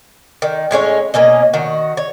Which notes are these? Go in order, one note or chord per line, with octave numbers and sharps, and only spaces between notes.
D#3
A2 G#3 C#4 C#5
B2 A#3 C#4 D#5
D#3 F#4
C#5